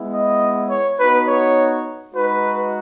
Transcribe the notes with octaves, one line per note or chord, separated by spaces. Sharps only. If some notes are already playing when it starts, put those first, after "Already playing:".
Already playing: G#3 B3 E4
D#5
C#5
B3 D#4 F#4 B4
C#5
G#3 D#4 F#4 B4